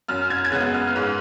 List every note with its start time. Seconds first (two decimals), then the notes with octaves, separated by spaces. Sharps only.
0.08 F#2 F6
0.30 G#6
0.44 G#6
0.52 C#3 G#3 B3 F#6
0.74 F6
0.96 G#2 F#6